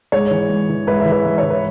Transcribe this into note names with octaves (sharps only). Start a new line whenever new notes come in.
G#2 G#4 C#5
E3
G#2
E3
G#2 B4 E5
B4 E5
E3
B4 E5
G#2 E5
C#5
E3
B4